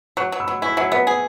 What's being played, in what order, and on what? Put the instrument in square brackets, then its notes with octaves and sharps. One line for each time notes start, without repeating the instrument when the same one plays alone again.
[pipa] F#3 [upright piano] C#6 F#6
[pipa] F#3
[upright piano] B5 E6
[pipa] F#3
[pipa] E4 [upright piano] G#5 C#6
[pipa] F#3 [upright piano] E5 G#5
[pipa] B3 [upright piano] B4 E5
[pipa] G#4